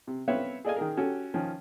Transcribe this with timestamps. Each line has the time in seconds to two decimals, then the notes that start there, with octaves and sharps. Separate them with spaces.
0.07 C3
0.28 B3 C4 B4 C#5 E5 F5
0.65 G#4 A4 D5 D#5 F5 G#5
0.76 D#3 G#4 A#4
0.97 C#4 F#4 G4 A4
1.34 D#3 F3 C#4